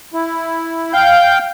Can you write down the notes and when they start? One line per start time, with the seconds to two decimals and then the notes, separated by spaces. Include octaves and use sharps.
0.13 E4
0.93 F5 G5 G6